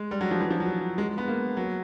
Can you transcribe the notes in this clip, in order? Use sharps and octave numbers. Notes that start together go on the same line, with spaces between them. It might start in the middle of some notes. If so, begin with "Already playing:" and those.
Already playing: G#3
G3
F#3
F3
E3
F3
F#3
G#3
B3
A#3
F#3